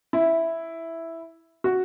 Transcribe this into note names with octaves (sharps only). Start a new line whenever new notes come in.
E4
F#4